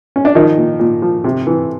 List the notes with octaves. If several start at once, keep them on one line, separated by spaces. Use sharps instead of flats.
C#4
D4
D#3 F3 D#4
A#2
A#2
F3
C3
E3